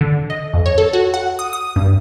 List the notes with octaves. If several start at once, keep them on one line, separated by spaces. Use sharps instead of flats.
D3
D#5
F2
C#5
A4
F#4
F#5
D#6
D#6
G2